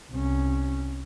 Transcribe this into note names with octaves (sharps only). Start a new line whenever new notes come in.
C2 C#4